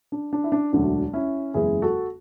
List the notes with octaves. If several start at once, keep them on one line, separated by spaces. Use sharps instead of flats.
D4
D4
E4
D4
E1 D2 D3 F#3 A3 D4
C#4 E4
F#1 E2 C#3 G#3 E4 G#4
F#4 A4